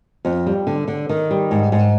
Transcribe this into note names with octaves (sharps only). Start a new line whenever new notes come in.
F2
G3
D3
D3
D#3
G3
G#2
G#2